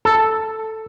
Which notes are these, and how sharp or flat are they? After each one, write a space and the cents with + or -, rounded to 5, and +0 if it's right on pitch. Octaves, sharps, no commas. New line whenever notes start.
A4 +0